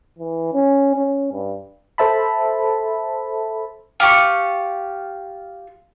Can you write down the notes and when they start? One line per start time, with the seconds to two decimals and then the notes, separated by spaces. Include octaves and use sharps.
0.19 E3
0.54 C#4
0.96 C#4
1.33 G2
1.98 A4 C5 E5 A5 B5
4.00 F4 G4 C#6